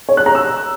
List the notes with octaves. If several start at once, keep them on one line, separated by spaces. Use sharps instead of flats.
C#5
F#6
A#5
E6